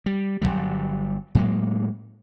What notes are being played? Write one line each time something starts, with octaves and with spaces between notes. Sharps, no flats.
G3
G1 E2 F#3 G3
A2 F#3 G#3 A#3